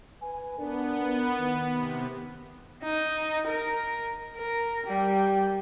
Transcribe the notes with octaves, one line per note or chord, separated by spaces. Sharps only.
B4 G#5
B3 D4 A#4
D#3
C3
D#4
A#4
A#4
G3